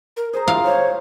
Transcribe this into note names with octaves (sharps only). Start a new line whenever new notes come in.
A#4
G#4 C5 A#5
E4 F4 G4 F5
C5 C#5